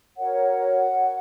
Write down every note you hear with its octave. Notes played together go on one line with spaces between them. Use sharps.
F#4 A#4 C#5 F#5